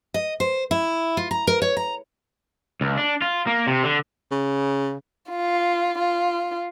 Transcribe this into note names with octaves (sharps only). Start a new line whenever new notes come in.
D#5
C5
E4
F4
A#5
A#4
C#5
A#5
C#2
D4
F4
A#3
C3
D3
C#3
F4
F4